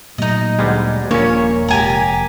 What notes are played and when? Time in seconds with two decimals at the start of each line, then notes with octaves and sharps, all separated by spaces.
0.18 A#2 F#3 A3 D#4 D#5
0.59 D2 G3 G#3
1.11 D#1 A#2 F3 A#3 C#4 D4 C#5
1.68 F1 G#3 G4 G#5 A#5